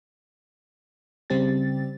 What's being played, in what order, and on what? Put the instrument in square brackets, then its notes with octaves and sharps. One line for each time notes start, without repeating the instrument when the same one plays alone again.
[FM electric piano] C#3 G3 C4 G4 A6